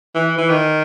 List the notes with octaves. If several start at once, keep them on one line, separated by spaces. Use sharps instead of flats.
E3
E3
D#3